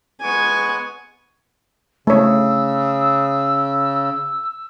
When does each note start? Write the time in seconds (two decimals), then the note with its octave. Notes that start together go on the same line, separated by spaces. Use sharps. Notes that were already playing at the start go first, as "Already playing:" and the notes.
0.22 G#3 B3 G#5 C#6
2.07 C#3 A3 C#5 E6